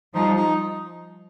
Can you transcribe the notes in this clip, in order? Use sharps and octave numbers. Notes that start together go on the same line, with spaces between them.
F3 G3 D#4
D#4